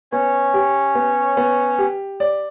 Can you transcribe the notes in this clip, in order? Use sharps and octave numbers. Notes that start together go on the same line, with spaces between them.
B3 C#4 C#5
G4
B3
B3
G4
D5